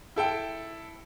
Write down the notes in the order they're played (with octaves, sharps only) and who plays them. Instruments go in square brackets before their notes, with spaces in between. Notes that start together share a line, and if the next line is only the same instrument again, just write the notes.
[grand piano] E4 A4 G5